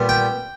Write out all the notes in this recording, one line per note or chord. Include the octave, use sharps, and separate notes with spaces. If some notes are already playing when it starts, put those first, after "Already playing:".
Already playing: A#2 G3 B3
G5